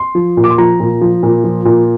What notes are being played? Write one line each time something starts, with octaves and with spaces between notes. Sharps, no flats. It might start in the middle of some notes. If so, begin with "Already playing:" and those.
Already playing: C6
F3
A#2
D6
C6
F3 A#5
A#2
F3
A#2
F3
A#2